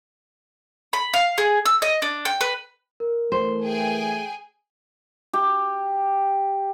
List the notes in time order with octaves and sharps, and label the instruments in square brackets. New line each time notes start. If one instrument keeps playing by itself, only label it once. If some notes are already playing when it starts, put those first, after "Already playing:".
[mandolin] B5
F5
G#4
E6
D#5
D4
G5
B4
[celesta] A#4
[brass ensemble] E3 A3 [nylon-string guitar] C5
[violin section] G#4 G5 G#5
[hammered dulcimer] G4